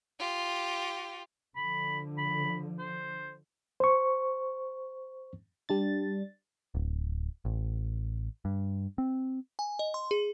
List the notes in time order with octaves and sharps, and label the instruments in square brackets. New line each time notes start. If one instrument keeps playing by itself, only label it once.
[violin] F4 G4
[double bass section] D3 F3 [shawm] B5
[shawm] B5
C5
[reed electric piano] C5 C#6
[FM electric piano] G3 D4 A6
[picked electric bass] D1
A1
G2
C4
[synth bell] G#5
D#5
C6
G#4